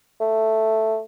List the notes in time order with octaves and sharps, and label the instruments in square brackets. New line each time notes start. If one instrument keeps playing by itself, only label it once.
[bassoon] A3